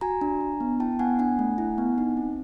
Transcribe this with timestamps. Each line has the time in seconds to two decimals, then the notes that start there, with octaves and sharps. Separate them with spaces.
0.01 F#4 G#5 A#5
0.21 D4
0.41 D4
0.60 B3
0.80 E4 G5 A5
0.99 B3 F#5 G#5
1.19 D4 F#5 G#5
1.39 A3
1.58 E4
1.78 B3
1.98 D#4
2.17 C4